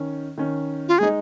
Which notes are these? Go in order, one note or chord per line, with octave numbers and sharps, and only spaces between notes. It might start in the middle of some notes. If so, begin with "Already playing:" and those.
Already playing: D#3 C#4
D#3 C#4
F4
G#3 D#4 G#4